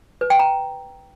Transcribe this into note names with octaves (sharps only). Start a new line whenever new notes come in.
B4
G5
A#5